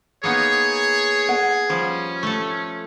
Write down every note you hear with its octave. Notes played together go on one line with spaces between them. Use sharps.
A#3 B3 D#4 G#4 C#5
F#5
F3 G3 C#4
A3 A4